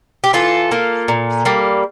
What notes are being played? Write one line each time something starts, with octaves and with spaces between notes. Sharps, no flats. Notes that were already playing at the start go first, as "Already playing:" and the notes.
G4
E3 F4 A4
A#3 F4
A#2
G3 A#3